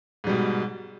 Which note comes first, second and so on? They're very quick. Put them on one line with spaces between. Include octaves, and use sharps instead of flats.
G#2 G3 B2